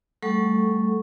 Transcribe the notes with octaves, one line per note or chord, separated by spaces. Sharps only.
G3 A3 A4 F#5 C#6